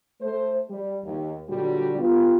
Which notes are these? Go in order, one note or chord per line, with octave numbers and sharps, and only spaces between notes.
A3 C5
G3
D#2
A#2 D3 F#3 G3 F#4
B3 F4 G4